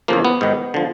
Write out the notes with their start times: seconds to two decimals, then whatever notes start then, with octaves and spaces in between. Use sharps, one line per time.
0.08 E2 C#3 F3 A#3
0.25 B3
0.41 G#2 D#3
0.74 D3 F3